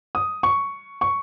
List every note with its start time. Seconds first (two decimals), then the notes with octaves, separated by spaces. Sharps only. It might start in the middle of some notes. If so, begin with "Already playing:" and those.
0.15 D#6
0.43 C#6
1.01 C#6